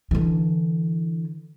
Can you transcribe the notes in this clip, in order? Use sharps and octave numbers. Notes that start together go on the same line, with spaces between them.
D3 E3